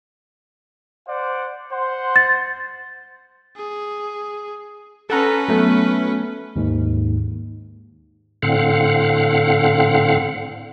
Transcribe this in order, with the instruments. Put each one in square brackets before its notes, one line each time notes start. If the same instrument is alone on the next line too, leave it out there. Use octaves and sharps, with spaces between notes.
[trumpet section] C5 D5 F#5
C5 F#5 C6
[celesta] A6
[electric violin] G#4
[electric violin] C#4 B4 [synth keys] A4 F#5 A#5
[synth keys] F#3 A3 B3
[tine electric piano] D#2 G#2
[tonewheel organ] A2 D3 C4 F5 F#5